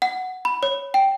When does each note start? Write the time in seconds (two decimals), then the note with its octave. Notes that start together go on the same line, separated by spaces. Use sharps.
0.02 F#5
0.45 B5
0.63 C#5
0.94 G5